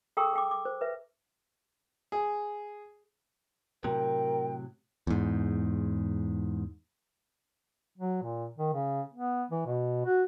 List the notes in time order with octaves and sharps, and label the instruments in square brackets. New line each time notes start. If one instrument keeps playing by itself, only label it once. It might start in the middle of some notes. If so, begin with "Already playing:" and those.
[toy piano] G#4 A4 G5 A#5 C#6 E6
G#4 G5 D6
D6
C5
B4 E5
[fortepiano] G#4
[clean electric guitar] A2 C3 F#3 [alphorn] A#4 [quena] G5
[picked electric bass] E2 G#2
[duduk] F#3
A#2
D#3
C#3
B3
E3
B2
F#4